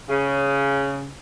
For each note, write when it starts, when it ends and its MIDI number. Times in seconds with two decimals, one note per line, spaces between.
0.09 1.08 49